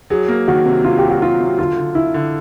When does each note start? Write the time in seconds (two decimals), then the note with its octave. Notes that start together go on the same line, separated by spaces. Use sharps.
0.10 F#3 G#4
0.28 A#3
0.48 D#3 F#4
0.66 C3
0.84 C3 F4
0.98 F#3 G4
1.09 F#4
1.22 F#3 F4
1.40 C3
1.59 D3 F4
1.77 D3
1.95 D3 E4
2.14 D3